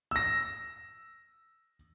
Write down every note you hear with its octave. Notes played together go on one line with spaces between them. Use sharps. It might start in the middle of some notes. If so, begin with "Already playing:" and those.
E6 A#6